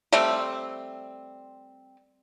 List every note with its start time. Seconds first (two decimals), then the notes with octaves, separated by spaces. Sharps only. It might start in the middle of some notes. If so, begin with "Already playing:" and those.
0.13 G3 A3 C4